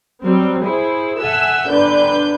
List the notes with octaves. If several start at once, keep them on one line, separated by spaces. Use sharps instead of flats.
F#3 G3 C4
E4 G#4 C5
A4 E5 F#5 G#5 E6
G1 D3 D4 B4 G6